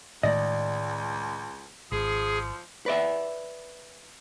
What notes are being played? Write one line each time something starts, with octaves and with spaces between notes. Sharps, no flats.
C#2 A2 D#3 G#3 D5 D#5
G#1 F3 G#4
B4 D5 E5